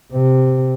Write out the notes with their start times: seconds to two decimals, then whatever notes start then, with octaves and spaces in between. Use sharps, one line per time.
0.13 C3